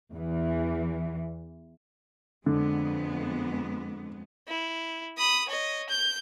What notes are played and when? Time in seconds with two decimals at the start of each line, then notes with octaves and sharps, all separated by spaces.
0.12 E2 E3
2.46 F2 D3 G#3 B3
4.48 E4
5.18 B5 D#6
5.48 C#5 D#5
5.89 G6